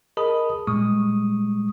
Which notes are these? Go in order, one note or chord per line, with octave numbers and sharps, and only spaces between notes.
G#4 A#4 D#5 A5 B5 D#6
A#2 G3 G#3 C#6 D#6